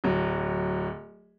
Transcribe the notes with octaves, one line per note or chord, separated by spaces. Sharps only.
D1 F#3